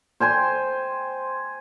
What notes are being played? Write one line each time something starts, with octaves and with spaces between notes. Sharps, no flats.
C5 G5 G#5 C6